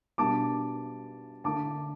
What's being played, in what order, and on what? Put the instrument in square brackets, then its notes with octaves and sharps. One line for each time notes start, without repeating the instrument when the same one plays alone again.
[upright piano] B2 G3 D4 A5 D6
D3 A3 D4 A5 D6